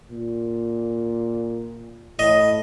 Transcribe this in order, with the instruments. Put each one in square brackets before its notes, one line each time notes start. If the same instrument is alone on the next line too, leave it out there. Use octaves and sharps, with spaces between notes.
[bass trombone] A#2
[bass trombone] A2 [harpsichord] D#5